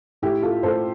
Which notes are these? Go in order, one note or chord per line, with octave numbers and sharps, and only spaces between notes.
A2 E4 G4
F4 A4
A2 A4 C5